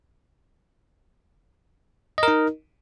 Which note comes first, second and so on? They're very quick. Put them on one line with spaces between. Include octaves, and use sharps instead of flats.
D#5 A#4 D#4